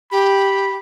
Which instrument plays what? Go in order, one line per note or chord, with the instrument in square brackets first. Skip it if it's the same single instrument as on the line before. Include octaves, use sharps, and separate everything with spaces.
[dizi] G4 [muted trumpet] B5